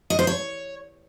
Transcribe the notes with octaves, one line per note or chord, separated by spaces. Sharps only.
D#5
C5
C#5